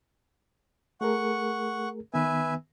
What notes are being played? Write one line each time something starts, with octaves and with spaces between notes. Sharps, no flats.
A3 G#4 A#4 F#5 C#6
D#3 B3 B4 E5 G#5